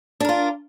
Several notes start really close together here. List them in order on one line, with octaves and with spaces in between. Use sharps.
D4 A#4 F4